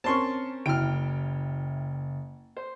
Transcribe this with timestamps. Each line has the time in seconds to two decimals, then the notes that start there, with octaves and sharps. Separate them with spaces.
0.04 C4 C#4 A#4 A5 C6 C#6
0.66 F#1 E4 G5 F6 D7
2.57 C5